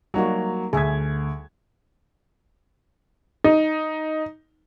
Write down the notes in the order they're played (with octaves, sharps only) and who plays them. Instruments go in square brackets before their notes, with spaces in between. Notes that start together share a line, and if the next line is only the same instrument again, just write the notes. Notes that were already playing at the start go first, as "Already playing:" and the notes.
[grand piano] F#3 A#3 [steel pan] G3 D#4 F#4
[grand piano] D2 G#6 [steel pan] G#4 E5
[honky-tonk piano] D#4